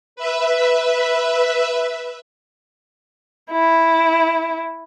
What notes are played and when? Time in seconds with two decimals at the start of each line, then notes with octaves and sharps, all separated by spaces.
0.16 B4 E5
3.51 E4